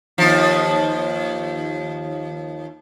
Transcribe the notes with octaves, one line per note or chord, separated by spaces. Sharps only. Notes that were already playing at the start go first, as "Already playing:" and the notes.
D#2 F3